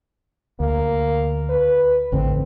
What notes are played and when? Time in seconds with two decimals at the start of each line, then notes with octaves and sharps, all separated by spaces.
0.60 D2 A#3
1.49 B4
2.12 A1 F2 D3 C4